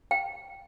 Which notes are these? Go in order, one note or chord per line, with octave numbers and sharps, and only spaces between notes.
G5